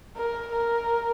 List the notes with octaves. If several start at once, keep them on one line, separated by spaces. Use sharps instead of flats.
A#4
A#4